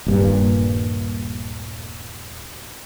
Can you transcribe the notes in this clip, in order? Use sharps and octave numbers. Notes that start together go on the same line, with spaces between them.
D#1 G2 A#2